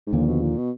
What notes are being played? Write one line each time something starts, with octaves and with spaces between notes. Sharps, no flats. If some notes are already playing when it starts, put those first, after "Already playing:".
G#2
D#2 A#2 D3 F3
B2
A#2
B2